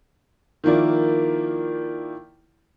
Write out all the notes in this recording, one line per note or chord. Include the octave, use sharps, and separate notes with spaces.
D#3 F3 A#3 E4 D5